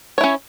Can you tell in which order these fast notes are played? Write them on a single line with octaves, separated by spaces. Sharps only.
C#5 E4 C#4